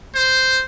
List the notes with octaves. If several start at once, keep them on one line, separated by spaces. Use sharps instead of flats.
C5